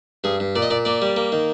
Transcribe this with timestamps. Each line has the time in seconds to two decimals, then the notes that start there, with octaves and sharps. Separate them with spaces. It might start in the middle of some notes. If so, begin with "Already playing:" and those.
0.24 G2 G#4
0.40 G2
0.55 A#2 D5
0.62 D#5
0.70 A#2 D5
0.85 A#3 D5
1.02 G3
1.16 A#3
1.32 D#3